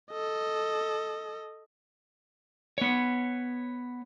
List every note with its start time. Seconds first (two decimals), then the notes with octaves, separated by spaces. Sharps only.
0.11 A4 D#5
2.78 B3 C#5